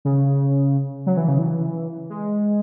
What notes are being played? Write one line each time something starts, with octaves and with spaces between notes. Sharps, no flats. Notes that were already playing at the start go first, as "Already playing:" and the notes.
C#3
F#3
E3
C#3
E3
G#3